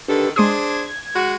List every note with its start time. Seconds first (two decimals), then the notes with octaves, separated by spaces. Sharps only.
0.08 D3 D#3 D4 G4 A4 B4
0.36 G#3 D4 G#4 C5 C6 D#6 G#6
1.15 G#3 F#4